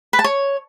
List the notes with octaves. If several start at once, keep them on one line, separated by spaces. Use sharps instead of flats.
B4
A5
C#5